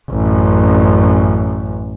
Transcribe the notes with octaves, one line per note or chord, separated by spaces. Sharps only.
A1 F#2